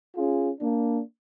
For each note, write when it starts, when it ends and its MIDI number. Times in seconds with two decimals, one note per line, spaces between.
0.16 0.50 61
0.16 0.50 65
0.16 0.50 68
0.60 1.00 58
0.60 1.00 62